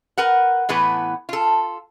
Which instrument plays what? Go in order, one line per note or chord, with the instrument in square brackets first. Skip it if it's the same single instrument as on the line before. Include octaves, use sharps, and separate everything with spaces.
[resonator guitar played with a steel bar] A#4 B4 F#5
A2 E3 B3 B4
F4 A4